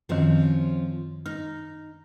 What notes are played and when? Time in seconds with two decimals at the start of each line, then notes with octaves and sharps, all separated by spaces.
0.09 F#2 D#3 F3 C4 C#4
1.26 D#4 F6